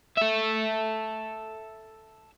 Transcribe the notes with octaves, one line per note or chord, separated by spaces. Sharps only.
A4 E5